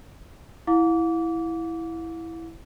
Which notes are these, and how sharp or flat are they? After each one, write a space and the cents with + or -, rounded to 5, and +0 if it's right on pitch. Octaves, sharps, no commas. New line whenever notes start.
E4 +0 F5 +45 D6 -30